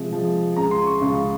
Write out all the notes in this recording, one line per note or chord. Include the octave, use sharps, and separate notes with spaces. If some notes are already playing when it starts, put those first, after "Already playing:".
Already playing: C3 F3 G#3
C3 F3 G#3
C#2 C#3 G#3 A#5
C6
C#6
C#2 C#3 G#3